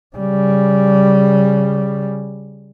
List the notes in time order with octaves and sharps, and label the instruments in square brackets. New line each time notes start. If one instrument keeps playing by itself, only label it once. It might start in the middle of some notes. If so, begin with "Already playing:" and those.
[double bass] C#3 G3